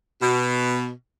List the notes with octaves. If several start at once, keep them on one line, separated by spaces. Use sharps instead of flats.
B2